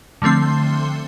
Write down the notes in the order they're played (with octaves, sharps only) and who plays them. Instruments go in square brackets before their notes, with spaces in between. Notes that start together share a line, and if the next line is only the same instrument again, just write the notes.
[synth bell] D3 F3 A3 C4 C6